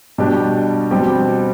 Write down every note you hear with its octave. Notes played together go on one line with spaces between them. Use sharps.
B2 G3 D4 G4
B2 G3 C4 G4